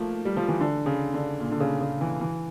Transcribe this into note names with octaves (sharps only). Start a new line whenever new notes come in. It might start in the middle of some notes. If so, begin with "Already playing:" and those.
Already playing: F3 A3 A#3
G3
F3
E3
D3
C#3
D3
A#2
D3
C#3
C#3
E3
E3